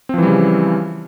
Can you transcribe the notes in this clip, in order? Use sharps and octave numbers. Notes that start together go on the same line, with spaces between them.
C#3 E3 F3 G3 C4